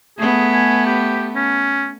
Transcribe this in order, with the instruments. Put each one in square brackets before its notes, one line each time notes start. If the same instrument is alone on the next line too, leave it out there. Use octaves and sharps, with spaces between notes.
[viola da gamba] A3 B3 [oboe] G#4
[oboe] G#5
G4
C#4